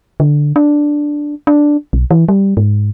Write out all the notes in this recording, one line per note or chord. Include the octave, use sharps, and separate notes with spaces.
D3
D4
D4
B1
E3
G3
G#2